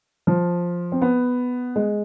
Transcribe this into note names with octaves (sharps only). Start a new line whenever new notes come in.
F3
C4
B3
G#3